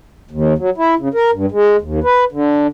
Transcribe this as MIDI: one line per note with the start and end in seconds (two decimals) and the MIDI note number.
0.31 0.53 39
0.58 0.70 54
0.77 0.95 64
0.99 1.08 49
1.14 1.31 70
1.33 1.46 43
1.52 1.77 56
1.81 2.00 39
2.04 2.24 71
2.32 2.67 50